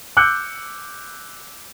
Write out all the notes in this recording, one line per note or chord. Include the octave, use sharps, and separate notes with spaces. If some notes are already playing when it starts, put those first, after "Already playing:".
D6 E6 F#6 G6 C#7